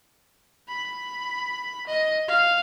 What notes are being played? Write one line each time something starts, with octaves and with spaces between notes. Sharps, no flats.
B5
D#5
F5